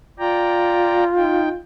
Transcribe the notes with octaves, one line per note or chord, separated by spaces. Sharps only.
F4 D5 G5 A#5
D#4 G5